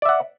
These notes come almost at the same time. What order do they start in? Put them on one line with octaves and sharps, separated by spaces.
D5 E5 F#5